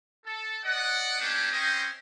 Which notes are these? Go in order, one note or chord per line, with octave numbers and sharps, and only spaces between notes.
A4
D5 D#5 F#5
A3 A#3 C#4 D4 G4
C4 C#4 C5 D#5 G5